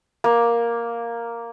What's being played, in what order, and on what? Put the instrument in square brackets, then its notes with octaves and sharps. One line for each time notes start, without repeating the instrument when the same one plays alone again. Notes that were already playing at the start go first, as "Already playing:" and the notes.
[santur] A#3